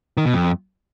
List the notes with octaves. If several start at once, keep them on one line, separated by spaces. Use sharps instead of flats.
D#3
B2
F2